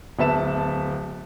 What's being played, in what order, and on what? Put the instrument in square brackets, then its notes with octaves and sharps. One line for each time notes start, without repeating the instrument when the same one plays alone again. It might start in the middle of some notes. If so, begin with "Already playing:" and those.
[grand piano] D1 B3 E5 A5 E7